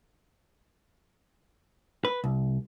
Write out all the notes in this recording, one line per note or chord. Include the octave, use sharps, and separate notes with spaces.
B4
C2